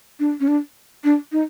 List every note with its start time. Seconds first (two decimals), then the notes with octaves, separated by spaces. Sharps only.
0.20 D4
0.40 C#4
0.48 D4
1.04 D4
1.32 D#4